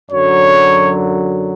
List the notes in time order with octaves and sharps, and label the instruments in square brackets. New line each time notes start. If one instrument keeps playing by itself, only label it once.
[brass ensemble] F#2 D3 F#3 C#5